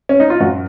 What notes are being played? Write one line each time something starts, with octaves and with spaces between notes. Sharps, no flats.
C#4
D#4
F4
F#2 F#4